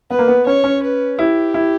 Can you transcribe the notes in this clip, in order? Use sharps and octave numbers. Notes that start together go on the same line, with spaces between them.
B3 B4
A#3
B3
C#4 C#5
C#4
B4
E4 G4
E4